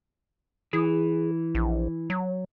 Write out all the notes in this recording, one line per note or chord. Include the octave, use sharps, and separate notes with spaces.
E3 G#4
A#1
F#3